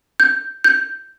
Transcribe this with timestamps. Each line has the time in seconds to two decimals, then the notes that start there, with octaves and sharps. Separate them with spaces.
0.20 G6
0.64 G6